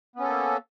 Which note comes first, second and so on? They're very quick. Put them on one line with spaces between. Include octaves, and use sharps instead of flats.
B3 C#4 A4 A#3